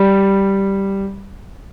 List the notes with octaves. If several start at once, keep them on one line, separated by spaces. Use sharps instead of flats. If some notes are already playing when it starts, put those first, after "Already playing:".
Already playing: G3